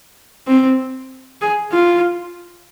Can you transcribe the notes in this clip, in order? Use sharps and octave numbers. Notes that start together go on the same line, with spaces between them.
C4
G#4
F4